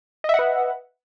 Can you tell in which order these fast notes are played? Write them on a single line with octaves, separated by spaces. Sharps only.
D#5 E5 F#5 B4